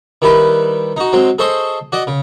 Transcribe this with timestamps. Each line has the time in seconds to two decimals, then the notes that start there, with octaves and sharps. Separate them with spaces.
0.22 D#3 G3 E4 B4
0.96 D#4 F#4
1.13 F#3 G#3 C4
1.38 G#4 A4 C5 D#5 C#6
1.92 F#4 D5 D#5
2.07 C#3